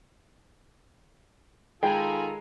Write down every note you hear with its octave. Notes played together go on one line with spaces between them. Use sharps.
D#3 G#3 F4 A4 G5 G#5 A#5 B5